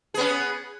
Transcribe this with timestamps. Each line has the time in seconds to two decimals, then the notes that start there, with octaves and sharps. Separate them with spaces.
0.14 G#4
0.17 B3
0.20 C#4